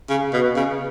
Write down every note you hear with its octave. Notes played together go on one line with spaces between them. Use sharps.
C#3
B2
C#3